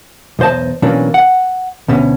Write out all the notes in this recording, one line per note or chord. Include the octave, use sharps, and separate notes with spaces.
B1 E2 C5 D#5 A5
B2 E3 F#3 A#3 C#4 D4
F#5
D2 B2 C#4